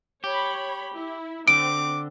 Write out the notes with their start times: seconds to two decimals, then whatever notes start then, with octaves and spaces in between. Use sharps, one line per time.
0.24 G4 C#5 B5
0.93 E4
1.48 D3 C4 D6 D7